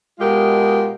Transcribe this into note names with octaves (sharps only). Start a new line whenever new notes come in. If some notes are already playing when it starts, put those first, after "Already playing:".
B2 G#3 F4 G4 A#4